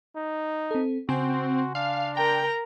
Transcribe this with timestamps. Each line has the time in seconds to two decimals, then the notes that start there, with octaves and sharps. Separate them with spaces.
0.16 D#4
0.71 C4 A4
1.09 C#3 C4 F#4 G#5 C6
1.75 D4 F5
2.17 A#4 G5 A#5